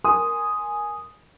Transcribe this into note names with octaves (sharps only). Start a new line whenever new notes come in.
A#4 G#5 C6 D#6